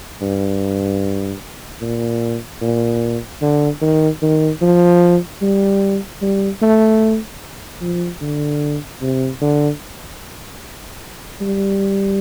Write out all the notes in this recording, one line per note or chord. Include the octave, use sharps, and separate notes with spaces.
G2
A#2
A#2
D3
D#3
D#3
F3
G3
G3
A3
F3
D3
C3
D3
G3